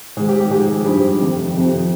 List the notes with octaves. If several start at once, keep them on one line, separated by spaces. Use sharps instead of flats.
G#2 D#3 G#4
G4
G4
G#2 F3 G#4
G2 F3 G4
F2 C3 D#3
F2 C3 F3